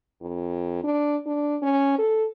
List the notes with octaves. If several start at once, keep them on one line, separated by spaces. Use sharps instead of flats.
F2
D4
D4
C#4
A4